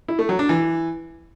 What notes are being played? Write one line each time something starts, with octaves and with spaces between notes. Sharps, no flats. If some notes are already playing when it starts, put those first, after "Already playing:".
E4
A3
F#3
D4
E3